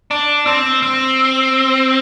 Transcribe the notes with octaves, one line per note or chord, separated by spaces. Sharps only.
D4
C4
C4